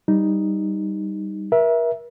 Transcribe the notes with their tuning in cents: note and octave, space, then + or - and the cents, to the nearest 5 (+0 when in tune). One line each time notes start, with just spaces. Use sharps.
G3 +0 D#4 +0
A#4 +40 E5 +0